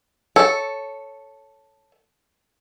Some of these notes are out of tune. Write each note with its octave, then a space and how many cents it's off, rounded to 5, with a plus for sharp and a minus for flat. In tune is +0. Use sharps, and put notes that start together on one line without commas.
A4 +0 C#5 +0